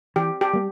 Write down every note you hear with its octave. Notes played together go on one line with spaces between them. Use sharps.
E3 G4
G4
G3 A#3